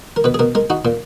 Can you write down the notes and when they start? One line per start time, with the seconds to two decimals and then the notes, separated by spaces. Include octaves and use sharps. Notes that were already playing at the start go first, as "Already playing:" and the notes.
0.16 A#4
0.24 B2 B4
0.34 G#4
0.39 B2 A#4
0.55 G#3 A#4
0.70 D#4 F#4
0.85 A#2